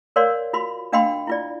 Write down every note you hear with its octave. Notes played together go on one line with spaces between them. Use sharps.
A#4 C#5 D5 F5 C6
F4 F#4 B5 C6
D4 D#5 F5 G5 B5 C6
E4 F4 D5